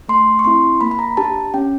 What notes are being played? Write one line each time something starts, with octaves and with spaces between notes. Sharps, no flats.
A3 C6
C#6
C4 E4 C6
A#3 B5
B5
A#5
D4 G4 A5
C#4 G5